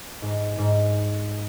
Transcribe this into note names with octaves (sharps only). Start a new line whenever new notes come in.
G#2
G#2